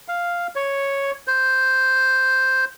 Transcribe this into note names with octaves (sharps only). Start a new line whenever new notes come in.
F5
C#5
C5